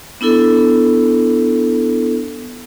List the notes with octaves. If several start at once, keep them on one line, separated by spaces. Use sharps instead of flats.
B3 D4 E4 A4